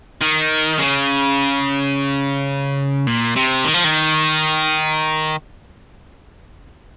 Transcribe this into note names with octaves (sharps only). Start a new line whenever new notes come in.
D#3
C#3
A#2
C3
D#3
F3
D#3